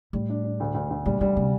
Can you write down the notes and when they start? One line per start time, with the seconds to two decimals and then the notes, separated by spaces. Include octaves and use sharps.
0.13 A2 G3
0.29 D4
0.44 D4
0.60 D2
0.74 D2
0.90 D2
1.06 A#2 G3
1.21 D3 G3
1.37 C3